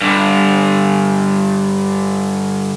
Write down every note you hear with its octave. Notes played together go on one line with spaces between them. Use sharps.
G2 D3